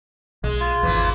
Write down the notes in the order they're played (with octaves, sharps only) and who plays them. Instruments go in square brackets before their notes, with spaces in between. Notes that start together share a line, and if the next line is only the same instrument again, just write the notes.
[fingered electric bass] B1 [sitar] G#3
[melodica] F4
[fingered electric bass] G#1 E2 [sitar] E3 F3 A#3